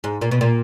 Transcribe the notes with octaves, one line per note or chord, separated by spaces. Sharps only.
G#2
A#2
B2
A#2